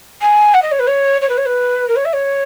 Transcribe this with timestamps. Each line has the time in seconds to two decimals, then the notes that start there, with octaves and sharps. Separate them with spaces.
0.21 G#5
0.54 F#5
0.62 D#5
0.71 C#5
0.79 B4
0.87 C#5
1.21 C#5
1.29 B4
1.37 C#5
1.45 B4
1.88 A#4
1.96 C#5
2.05 E5
2.13 C#5